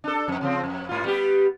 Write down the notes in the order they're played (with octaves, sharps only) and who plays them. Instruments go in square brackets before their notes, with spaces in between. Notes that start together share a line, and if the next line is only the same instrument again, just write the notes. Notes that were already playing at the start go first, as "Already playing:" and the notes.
[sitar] D4 A4
F2
C#3 F3 C4
F2
G#2 F4
G3 B3 G4